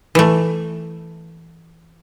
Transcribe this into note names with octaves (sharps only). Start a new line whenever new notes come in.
E3 A3